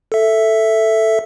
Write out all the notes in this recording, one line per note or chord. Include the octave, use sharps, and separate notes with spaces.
A4 E5